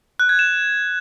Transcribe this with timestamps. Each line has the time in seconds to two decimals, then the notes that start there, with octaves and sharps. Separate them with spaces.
0.20 F#6
0.29 G#6
0.39 E7